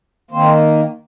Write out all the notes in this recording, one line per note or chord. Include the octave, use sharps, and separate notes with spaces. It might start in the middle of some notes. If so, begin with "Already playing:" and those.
D#3 A#3 C4 C5